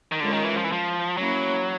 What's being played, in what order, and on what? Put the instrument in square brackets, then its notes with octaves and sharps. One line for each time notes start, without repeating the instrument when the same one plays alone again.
[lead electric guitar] D#3
[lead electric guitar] D3 [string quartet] G#3 C#4 F4 A#4 C#5
[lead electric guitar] D#3
E3
F3
E3
F3
[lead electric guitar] F#3 [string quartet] A#3 C#4 E4